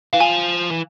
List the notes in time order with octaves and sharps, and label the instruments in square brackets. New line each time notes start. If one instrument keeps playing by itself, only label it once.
[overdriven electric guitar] E3 [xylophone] F5
[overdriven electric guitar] F3 [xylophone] G#5
[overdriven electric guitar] E3